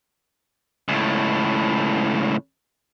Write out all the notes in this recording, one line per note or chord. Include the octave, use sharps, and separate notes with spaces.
C#2 A2